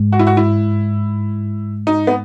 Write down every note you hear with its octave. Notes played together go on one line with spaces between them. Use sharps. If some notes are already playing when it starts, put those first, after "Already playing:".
Already playing: G#2
F#4
E4
F#4
E4
D#4
B3